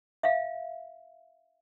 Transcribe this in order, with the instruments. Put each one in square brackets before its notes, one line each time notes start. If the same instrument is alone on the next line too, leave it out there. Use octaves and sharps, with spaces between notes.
[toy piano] E5 F5